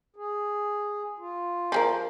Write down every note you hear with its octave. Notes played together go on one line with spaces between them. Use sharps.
G#4
F4
F3 G#4 A#4